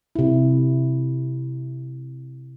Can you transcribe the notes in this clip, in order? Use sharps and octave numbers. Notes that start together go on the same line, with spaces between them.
C3 E4